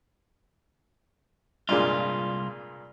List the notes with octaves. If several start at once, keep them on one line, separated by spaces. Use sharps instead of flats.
C2 G2 A#2 G#3 F4